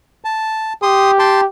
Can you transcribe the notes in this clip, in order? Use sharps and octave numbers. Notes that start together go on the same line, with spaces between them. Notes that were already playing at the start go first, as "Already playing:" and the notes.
A5
G4 C6 D#6
G5 A5 C6